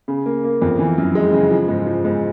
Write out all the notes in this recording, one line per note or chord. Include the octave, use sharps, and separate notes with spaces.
C#3
A#3
A#3
F2
E3
F#2
G#3
C#3
F3
G#2
F3
G#2